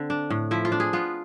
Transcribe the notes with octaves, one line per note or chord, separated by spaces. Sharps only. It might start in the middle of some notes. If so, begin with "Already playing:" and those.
Already playing: D3 C4
D4
A2
F3 E4
F4
D4
G#4
B3 F4